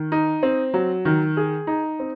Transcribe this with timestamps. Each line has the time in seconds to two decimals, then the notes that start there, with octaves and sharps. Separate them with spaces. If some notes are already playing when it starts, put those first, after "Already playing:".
Already playing: D#3
0.12 D#4
0.43 C4
0.74 F#3
1.05 D#3
1.37 G#4
1.67 D#4
2.00 C4